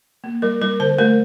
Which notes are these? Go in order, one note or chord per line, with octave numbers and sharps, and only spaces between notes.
A#3
G3 A#4
G3 A#4
D3 C5
A3 A#4